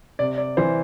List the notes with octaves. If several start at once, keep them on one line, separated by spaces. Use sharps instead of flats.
C3 D5
D5
E3 C5